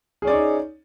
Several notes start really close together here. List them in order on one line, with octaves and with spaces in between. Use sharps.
G#4 C#4 D5 C#5 D#4